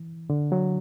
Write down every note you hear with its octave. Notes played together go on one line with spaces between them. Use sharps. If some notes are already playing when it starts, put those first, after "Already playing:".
Already playing: E3
D3
F#3